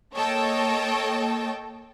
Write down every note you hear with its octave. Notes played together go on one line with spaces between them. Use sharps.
A#3 A4 C#5 D#5 G5 A5